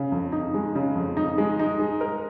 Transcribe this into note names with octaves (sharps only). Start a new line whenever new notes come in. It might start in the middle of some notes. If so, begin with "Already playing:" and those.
Already playing: C#3
F2
D#4
G#3
C#3
F2
D#4
G#3
D#4
G#3
A#4